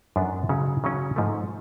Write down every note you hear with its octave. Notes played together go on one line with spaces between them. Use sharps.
F#2 F3 B3 D4
C#3 F#3 C#4
C#3 F#3 C#4
G#2 F3 A3